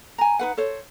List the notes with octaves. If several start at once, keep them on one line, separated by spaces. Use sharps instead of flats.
G#5 A#5
D#4 B4 F#5
A4 C5 C#5